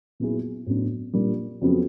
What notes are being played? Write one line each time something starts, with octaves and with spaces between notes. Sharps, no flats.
A#2 F#3 B3 E4 G#4
A2 F#3 B3 D4
A#2 G3 A#3 D4
F2 C#3 F#3 B3